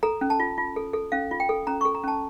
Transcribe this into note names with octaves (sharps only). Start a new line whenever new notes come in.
A4 A#5
C#4
A5
F4
F4
A4
A4
C#4 F5
F4
G5
A4
C#4 A#5
A4 C#6
A#5
C#4 A5